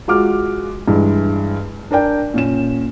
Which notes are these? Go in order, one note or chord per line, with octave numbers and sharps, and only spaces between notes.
G#3 F4 F#4 D6 F6
G2 E3 G#3
D4 A#4 D5 G5
A#2 C#4 E7